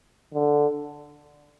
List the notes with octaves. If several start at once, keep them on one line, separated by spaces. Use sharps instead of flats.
D3